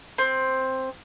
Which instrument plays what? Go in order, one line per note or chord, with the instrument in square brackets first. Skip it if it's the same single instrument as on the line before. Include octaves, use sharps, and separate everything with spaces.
[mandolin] C4